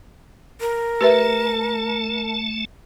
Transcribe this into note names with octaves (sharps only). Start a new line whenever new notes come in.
A#4
A3 G4 B4 E5 A5